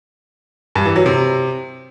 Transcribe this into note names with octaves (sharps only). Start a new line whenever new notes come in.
G2
E3
F#3
C3